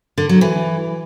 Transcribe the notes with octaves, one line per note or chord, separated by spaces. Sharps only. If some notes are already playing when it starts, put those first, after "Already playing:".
D3
F#3
E3